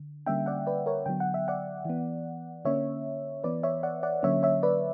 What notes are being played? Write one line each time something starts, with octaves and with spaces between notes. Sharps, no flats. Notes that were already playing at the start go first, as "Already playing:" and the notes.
Already playing: D3
D3 G3 A#3 C#4 E5 G5
D5 F#5
B4 D5
A#4 C#5
D3 F#3 B3 G5
F#5
E5
D5 F#5
E3 B3
D3 A#3 C#4 C#5 E5
E3 B3 B4 D5
C#5 E5
D5 F#5
D5 F#5
D3 F#3 A#3 C#4 C#5 E5
C#5 E5
B4 D5